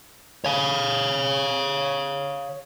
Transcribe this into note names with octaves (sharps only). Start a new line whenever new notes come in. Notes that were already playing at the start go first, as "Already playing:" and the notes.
C#5 F5